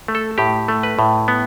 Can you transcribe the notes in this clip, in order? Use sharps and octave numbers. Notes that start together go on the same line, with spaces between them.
A3
A4
A2 G4
A3
B4
A2
B3